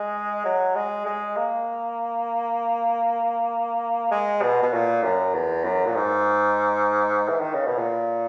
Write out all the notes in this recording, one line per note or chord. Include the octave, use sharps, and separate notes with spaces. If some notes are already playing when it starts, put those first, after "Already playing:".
Already playing: G#3
F#3
G#3
G#3
A#3
G#3
B2
B2
A#2
F#2
E2
F#2
A#2
G#2
E3
D#3
C#3
B2
A#2